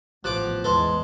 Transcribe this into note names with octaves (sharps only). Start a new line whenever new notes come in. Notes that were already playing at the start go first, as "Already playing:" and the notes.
A1 A2 F3 B3 D6 F#6
E2 A2 G#3 A4 B4 C6